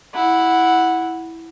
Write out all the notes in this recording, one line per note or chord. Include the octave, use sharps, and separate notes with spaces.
E4 F#5